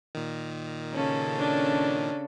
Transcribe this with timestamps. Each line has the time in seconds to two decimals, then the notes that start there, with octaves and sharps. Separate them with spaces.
0.15 A#2 D#3
0.94 C#3 C#4 A4
1.38 C#4 D4